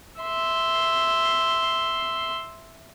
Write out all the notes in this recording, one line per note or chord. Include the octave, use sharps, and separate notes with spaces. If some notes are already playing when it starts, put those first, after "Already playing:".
E5 C6